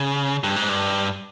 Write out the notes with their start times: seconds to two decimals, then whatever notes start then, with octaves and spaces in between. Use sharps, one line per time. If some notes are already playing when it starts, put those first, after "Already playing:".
Already playing: C#3
0.44 G2
0.56 G#2
0.69 G2